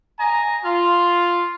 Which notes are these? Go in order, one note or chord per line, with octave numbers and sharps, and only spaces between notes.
D#5 G#5 A#5
F4